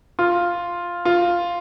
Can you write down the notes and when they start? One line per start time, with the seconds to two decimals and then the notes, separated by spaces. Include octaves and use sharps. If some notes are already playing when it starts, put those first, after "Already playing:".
0.19 F4
1.05 F4